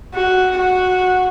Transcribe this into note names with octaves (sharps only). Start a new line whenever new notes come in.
F#4
F#4